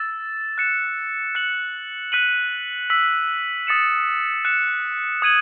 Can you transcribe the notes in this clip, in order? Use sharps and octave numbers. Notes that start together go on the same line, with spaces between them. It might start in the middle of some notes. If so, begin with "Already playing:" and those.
Already playing: E6 A6 E7
F#6 C#7 E7
F#6 C#7 F#7
F#6 B6 D#7 F#7
E6 B6 F#7
D#6 A6 C#7 E7
F#6 C#7 E7
D#6 G#6 D#7 F#7